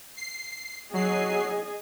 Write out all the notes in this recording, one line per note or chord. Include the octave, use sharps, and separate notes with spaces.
C7
F#3 G#4 D#5 C7